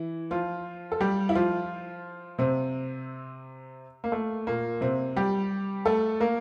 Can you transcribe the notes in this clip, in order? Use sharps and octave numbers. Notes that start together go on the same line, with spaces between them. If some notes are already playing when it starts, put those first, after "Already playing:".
Already playing: E3 E4
F3 F4
A4
G3 G4
E4
F3 F4
C3 C4
A#3
A3
A#2 A#3
C3 C4
G3 G4
A3 A4
A#3 A#4